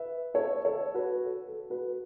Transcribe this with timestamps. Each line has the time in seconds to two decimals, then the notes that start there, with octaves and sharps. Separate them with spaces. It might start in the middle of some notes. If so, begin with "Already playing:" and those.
Already playing: B4 E5
0.34 A4 C#5
0.65 A4 C#5
0.94 F#4 B4
1.25 A4
1.48 A4
1.70 F#4 B4